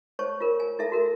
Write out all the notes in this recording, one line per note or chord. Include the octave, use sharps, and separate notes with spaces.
C5 C#5 A5 C#6
F4 A#4
G#5
E4 A4 E5 A5
F#4 A#4